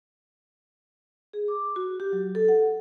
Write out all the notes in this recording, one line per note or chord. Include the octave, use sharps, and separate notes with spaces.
G#4
D6
F#4
G4
F#3
A4
F#5